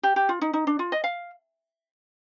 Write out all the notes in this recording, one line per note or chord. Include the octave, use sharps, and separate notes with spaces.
G4
G4
F4
D#4
D#4
D4
F4
D#5
F5